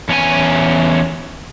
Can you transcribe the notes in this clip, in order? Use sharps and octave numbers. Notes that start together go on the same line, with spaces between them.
E2 C#4 F4 G#5